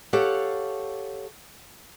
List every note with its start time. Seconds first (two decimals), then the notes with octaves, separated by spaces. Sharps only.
0.13 G4 A4 C#5 F5 F#5